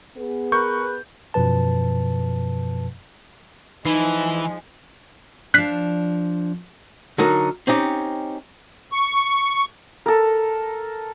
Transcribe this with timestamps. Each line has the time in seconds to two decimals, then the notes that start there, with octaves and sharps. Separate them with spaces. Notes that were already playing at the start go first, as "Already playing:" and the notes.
0.16 B3 G#4
0.52 A#4 B4 C#6 G6
1.34 F#2 B2 F3 B4 A5
3.85 E3 F3 G#3 D#4
5.54 F3 D4 F#6 B6 C7
7.18 D3 F#3 D#4 A#4
7.67 C4 C#4 D#4 G4
8.92 C#6
10.06 A4 A#4